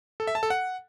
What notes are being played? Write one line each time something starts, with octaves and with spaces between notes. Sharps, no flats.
A4
E5
A5
A4
F#5